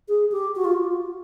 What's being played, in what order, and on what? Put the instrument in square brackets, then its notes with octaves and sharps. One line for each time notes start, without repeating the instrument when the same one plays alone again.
[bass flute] G#4
G4
F#4
F4